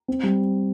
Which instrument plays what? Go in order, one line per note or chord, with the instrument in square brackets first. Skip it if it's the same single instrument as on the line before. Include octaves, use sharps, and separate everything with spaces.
[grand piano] C4
G3